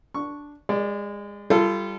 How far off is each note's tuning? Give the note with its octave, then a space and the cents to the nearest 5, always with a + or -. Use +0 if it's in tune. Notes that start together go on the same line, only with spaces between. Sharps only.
D4 -5 C#6 +0
G#3 -25 D5 +0
G3 +0 F4 -30 A4 +0